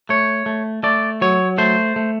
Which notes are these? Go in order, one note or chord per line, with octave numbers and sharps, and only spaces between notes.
A3 C#5
A3
A3 D5
F#3 C#5
A3 C5
A3